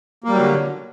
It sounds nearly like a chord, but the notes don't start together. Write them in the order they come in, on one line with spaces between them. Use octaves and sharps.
A#3 G3 F#3 D3